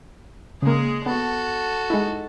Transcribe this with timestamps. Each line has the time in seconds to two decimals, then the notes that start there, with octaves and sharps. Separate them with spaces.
0.62 C#3 G#3 A#3 G#4
1.06 B3 F#4 A4
1.90 G#3 D#4 E4